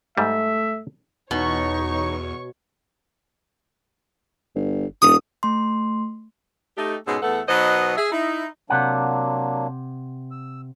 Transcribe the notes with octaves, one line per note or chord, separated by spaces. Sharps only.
G#2 G3 A3 E5
E2 B2 D#4 C#5 C#6
G1
E1 D#6
A3 C6
A3 D#4 G4
G#2 B2 G#3 C#4 A4
E2 A3 B3 A4 F#5
B2 F#3 D#4 B4 C5 D#5
G#4 E5
D#4 E4
C3 F#3 A#3 D4 F#5
E6